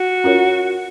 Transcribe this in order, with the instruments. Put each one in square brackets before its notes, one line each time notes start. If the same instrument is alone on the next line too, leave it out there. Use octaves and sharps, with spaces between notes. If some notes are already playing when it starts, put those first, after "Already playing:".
Already playing: [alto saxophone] F#4
[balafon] C#4 F4 A#4 C#5